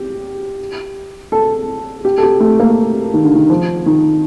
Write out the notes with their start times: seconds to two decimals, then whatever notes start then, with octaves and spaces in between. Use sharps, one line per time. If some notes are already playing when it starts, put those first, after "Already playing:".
Already playing: G4
1.32 A4
2.05 G4
2.18 A4
2.23 G4
2.40 A3
2.60 A#3
3.14 D#3
3.24 D3
3.35 D#3
3.50 F3
3.86 D#3